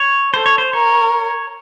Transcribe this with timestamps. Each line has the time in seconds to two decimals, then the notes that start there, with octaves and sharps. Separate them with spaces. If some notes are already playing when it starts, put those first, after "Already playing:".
Already playing: C#5
0.34 A4 C5
0.46 C#5
0.58 C5
0.73 A#4 C#5